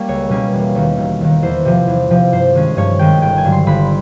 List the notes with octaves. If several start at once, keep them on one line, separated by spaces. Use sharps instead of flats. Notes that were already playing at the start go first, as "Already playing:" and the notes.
Already playing: G3 A#3 C#4
C#2 C#5
B2 G3 A#3 C#4
E1
D#2 D#3
E1
D#2 D#3
E2 C5
C3 F3
E2
C3 F3
G2 C5
D#3 G#3 C#4
G2 C#5
D#3 G#3 C#4 G5
G1 G5
G#5
G2 D3 F#3
C6
G1 B5